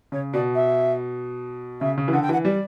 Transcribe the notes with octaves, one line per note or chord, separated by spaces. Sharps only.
C#3 C#5
B2 D5
E5
C#3 E5
C#3
E3
D3 F#5
G5
E3 F#5
G3 D5